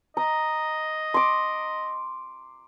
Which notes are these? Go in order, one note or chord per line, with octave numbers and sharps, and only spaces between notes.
D#5 A#5
C6 D6